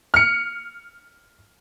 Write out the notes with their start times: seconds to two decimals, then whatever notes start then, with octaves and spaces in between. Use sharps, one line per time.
0.14 F6 C#7